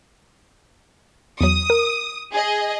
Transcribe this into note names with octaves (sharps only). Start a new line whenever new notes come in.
E2 F#3 D#6
A#4
G#4 D#5